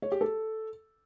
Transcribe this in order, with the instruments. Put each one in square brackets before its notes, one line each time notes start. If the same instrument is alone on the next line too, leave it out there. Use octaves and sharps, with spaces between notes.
[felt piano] C#5
G4
A4